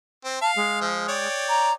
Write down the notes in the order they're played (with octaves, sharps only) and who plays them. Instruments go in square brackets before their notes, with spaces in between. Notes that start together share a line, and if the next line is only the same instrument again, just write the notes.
[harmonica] C4
[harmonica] F5 [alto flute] A5
[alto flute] G#3
[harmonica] F3
C#5 D5 G5
[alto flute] A#5